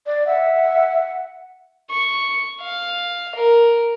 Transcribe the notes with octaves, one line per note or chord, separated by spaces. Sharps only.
D5
E5 F#5
C#6
F5
A#4